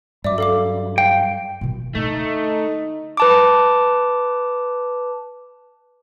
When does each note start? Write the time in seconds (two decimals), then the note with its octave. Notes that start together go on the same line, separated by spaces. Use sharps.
0.24 G2 F#3 D5 E5 D6
0.38 A4 F5 D6
0.98 F5 G5
1.61 B2 D#3
1.95 D3 A3 D4 D#4
3.17 B4 A5 D6